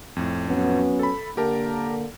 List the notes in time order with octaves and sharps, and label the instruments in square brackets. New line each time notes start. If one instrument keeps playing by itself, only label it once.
[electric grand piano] F2 A2
[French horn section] F#3 B3 C#4
[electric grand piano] A4 B5
[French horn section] D3 A#3 [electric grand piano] G4 A#4 A5